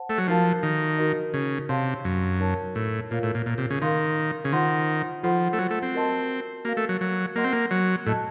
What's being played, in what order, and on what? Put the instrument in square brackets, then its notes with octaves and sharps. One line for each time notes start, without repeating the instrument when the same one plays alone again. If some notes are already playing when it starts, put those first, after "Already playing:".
Already playing: [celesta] C5 F#5 A5
[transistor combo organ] A3
F#3
[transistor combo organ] F3 [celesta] D#4 F#4 A#4 F5 A5
[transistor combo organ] D#3
[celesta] D#4 F#4 A#4 D#5
[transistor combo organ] C#3
[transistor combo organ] C3 [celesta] C#5 F5 A5 C6
[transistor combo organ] F#2
[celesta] D#4 A#4 C#5 A5
[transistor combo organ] A2
[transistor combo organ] A#2 [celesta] F4 A#4 C#5 F5
[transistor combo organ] A2
A#2
A#2
C3
C#3
[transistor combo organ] D#3 [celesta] A#4 F5 C6
[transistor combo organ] C#3
[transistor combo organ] D#3 [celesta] F4 C5 F#5 C6
[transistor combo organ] F3 [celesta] F4 A4 C5 F#5 C6
[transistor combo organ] A3
F#3
A3
C4
[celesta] F#4 A#4 D#5 A5 C6
[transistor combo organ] A#3 [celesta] F#4 A#4 F5
[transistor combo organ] A3
F#3
F#3
[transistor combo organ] A#3 [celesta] A#4 D#5 F#5 C6
[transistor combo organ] C4
A#3
F#3
[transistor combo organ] A2 [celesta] A4 D#5 A5